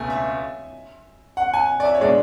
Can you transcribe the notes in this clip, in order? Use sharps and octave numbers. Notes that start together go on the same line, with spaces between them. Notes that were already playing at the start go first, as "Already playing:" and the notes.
Already playing: C#2 B2 A3 G#5
E5
F#5
G#5
D5
E5
C#5
B2 G#3 D4 D5